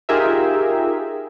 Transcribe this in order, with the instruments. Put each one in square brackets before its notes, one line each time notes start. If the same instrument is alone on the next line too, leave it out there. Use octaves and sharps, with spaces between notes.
[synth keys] D#4 F4 G4 G#4 A#4 E5